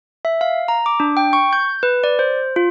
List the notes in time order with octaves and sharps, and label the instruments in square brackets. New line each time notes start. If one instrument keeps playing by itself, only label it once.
[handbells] E5
F5
A#5
D6
D4
G5
C#6
G6
B4
D5
C5
F4